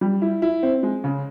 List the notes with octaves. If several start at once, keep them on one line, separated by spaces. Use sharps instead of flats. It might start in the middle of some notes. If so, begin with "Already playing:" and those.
G3
E4
E4
C4
G#3
C#3